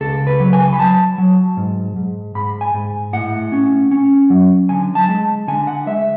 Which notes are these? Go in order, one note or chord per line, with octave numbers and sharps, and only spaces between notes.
C#2 A4
B4
F#3
G#5
B5
F#3 A5
F#3
G#2
G#2
G#2 B5
G#5
G#2
A2 F#5
C#4
C#4
F#3
D3 G#5
A5
G#3
D3 G#5
F#5
G#3 E5